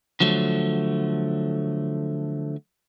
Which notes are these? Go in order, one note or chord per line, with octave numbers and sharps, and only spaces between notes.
D3 F3 F#3 A3